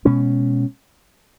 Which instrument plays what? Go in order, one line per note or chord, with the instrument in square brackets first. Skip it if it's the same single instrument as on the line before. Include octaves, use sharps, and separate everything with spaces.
[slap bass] B2 G#3 C#4